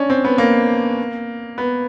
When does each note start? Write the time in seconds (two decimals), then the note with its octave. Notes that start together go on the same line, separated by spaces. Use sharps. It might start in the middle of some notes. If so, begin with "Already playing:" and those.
Already playing: C#4 D4
0.10 C4
0.25 B3
0.38 A#3
1.58 B3